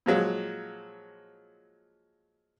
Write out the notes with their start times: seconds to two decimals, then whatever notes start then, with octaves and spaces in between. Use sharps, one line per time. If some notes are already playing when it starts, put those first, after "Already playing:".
0.06 A#2 F3 F#3 G#3